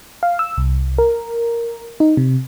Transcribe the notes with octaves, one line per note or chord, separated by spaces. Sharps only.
F5
E6
C2
A#4
D#4
C3